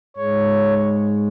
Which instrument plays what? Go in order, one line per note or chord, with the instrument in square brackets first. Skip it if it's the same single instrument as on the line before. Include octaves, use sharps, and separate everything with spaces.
[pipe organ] G#2 G#3 C#5